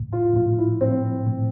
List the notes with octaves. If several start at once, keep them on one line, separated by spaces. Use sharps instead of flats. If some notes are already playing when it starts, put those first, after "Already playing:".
Already playing: A2
F4
A2 F4
E4
A2 C4
A2